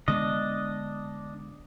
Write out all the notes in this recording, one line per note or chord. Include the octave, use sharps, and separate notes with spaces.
D3 G#3 B3 D4 D#5